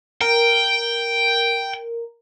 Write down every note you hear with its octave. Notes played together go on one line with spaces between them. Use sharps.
A#4 G5